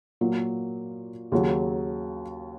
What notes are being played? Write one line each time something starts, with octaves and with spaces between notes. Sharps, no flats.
A#2 F#3 A#3
D#2 C#3 F#3